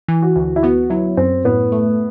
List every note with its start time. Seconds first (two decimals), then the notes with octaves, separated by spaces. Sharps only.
0.08 E3
0.22 F#4
0.36 D2
0.56 E4
0.63 B3 F#4
0.90 F#3 E4
1.17 F#2 C4
1.45 A2 B3
1.72 A3